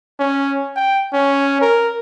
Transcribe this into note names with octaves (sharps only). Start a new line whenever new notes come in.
C#4
G5
C#4
A#4